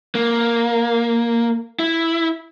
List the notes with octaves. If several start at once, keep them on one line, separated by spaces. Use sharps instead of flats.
A#3
E4